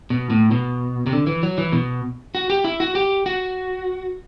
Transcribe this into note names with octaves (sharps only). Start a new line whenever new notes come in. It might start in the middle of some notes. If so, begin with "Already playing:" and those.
B2
A2
B2
C3
D3
E3
F#3
E3
B2
F#4
G4
E4
F#4
G4
F#4